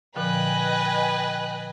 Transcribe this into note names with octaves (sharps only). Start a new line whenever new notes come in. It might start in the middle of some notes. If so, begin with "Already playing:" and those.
A#2 D3 F3 B4 D#5 G5 G#5 F#6